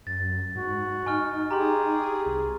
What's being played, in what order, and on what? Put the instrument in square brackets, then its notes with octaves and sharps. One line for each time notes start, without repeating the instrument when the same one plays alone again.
[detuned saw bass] F#2 [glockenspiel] A6
[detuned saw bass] G#2 [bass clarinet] F#4
[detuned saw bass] D#4 [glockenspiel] G#5 C#6 F6
[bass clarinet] G4 [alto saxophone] G#4 [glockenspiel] A#5 C6
[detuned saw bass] C2